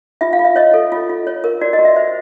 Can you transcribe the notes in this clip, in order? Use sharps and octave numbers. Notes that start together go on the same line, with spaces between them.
F4 E5
F5
F4
E5
C#5 D#5
A4
F4
F4
C#5
A#4
F#4 D5
D#5
F#4
E5
C5 E5